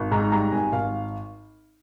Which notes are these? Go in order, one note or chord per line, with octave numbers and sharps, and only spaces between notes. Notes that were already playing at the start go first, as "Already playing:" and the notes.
Already playing: G#1
G#2 A#5
G3 A#5
G#1 G#5
G#1 F5